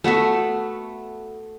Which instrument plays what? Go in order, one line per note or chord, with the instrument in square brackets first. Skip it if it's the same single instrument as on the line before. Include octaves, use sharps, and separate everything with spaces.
[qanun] A3 B3 F#4 E5